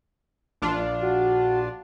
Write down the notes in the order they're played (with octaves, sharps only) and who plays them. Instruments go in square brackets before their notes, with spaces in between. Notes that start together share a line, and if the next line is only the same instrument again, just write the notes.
[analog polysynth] A#1 D4 F4
[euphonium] F#4